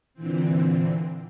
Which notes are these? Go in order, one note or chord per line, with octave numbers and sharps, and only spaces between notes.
A#2 D3 E3 C4